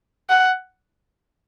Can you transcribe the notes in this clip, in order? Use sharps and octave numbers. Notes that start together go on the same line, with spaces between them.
F#5